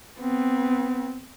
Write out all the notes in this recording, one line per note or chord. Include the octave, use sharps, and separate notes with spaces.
B3 C4